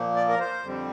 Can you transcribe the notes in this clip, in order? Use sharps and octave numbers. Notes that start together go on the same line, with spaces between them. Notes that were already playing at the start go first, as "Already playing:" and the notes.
Already playing: A#2 F3 A#3
D5
A#4
C5
F2 D3 G3 C4